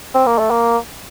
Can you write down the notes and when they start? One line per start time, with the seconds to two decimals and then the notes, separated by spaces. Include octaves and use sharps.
0.14 C4
0.26 A#3
0.38 A3
0.51 A#3